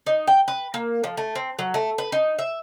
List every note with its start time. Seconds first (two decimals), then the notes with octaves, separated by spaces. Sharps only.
0.07 D#4
0.27 G5
0.48 B4
0.74 A#3
1.04 F3
1.17 A3
1.35 C4
1.59 F#3
1.74 A3
1.98 B4
2.12 D#4
2.39 E5